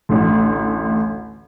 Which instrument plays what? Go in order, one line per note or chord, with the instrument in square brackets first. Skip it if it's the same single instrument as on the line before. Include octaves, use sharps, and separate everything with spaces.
[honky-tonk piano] A1 D2